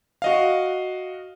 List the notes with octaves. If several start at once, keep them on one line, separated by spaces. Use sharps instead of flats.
F#4 D#5 F5